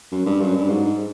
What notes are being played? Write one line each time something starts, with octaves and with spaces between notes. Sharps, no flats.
F#2
G2
F#2
G2
G#2